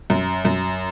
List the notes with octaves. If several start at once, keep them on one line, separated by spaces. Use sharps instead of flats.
F#2
F#2